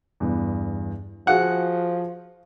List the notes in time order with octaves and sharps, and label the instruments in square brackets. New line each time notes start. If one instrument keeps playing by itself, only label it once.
[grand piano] E2 G2
[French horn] F3 [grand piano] F#4 G#4 F5 [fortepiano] F#5